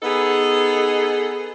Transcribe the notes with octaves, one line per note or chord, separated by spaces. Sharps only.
B3 D#4 G#4 A4